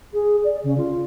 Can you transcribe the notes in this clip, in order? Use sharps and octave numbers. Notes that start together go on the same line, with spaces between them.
G#4
D5
C#3
F4